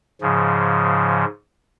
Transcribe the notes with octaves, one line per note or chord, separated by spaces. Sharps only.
G#2 C#3 F3